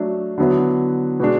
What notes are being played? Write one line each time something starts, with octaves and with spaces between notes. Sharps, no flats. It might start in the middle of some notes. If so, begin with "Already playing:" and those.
Already playing: F#3 A3 D4
D3 F#3 B3 E4
B2 G#3 D4